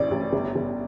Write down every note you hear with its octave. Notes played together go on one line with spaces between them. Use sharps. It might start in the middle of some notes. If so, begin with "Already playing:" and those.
Already playing: A1 A2 D5
A1
G1
G1